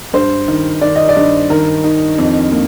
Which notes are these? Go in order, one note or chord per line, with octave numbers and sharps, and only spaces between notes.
G2 C5
D#3
D#3 D5
D#5
D5
G2
D#3 A#4
D#4
F2
A#3